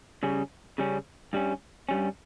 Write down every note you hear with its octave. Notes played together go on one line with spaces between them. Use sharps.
C#3 G3 C#4
C#3 G3 C#4
G2 G3 C#4
G2 G3 C#4